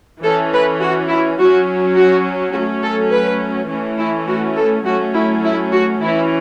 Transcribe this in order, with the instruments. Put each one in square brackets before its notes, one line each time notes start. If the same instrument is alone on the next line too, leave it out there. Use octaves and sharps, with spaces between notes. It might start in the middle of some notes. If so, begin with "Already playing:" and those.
[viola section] E3 C#4 A4
B4
F#4
E4
F#3 C#4 F#4
F#4
F#3 A3 C#4 F#4
A4
B4
E3 A3 C#4
E4
F#4
A4
F#3 A3 C#4 F#4
E4
E4
F#4
E3 C#4 E4